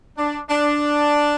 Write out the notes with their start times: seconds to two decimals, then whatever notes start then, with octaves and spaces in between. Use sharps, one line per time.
0.18 D4
0.50 D4